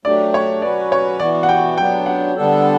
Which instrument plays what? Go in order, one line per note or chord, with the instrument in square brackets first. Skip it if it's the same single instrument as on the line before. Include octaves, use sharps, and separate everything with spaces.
[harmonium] F#3 A3 D4 G4 [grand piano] D5
[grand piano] C#5
[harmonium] F#3 C#4 F#4 B4 [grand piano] D5
[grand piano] C#5
[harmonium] E3 B3 F#4 [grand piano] D5
[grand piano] F#5
G5
[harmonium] F#3 B3 D4 [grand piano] G5
[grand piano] F#5
[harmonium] D3 G3 B3 D4 A4